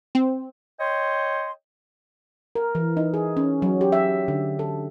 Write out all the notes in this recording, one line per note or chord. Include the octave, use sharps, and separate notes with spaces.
C4
C#5 D#5 G5 C6
A#4
E3
D#4
G#4
C#4
F#3
G4
E5
D3
A4